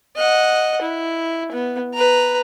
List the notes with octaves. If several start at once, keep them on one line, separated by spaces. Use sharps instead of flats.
D#5 F#5
E4
B3
B4 A#5